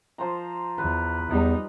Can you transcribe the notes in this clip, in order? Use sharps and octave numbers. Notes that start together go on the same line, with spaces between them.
F3 C5 A#5
E2 B4
E2 G3 D#4